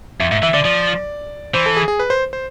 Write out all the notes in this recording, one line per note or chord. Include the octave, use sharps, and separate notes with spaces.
F2 E5
G#2 E5
E3 E5
D3 D5
F3 D5
E3 C5
A4
G#4
G#4
B4
C5
C5